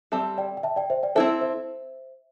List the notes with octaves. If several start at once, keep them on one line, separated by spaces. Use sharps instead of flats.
G3 C4 A4 E5 A5
D5 G5
G5
E5 A5
D5 G5
C5 E5
D5 G5
C4 E4 A4 C5 E5
C5 E5